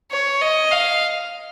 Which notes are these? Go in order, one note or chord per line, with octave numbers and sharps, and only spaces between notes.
C#5
D#5
F5